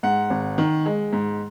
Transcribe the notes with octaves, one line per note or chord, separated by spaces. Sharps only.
G#2 F#5
G#1
D#3
G#3
G#2